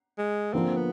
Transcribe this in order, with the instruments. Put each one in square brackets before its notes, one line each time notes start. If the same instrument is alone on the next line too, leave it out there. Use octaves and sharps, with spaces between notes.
[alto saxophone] G#3
[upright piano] D3 F3 A#3 D4 [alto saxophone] C4
[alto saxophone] B3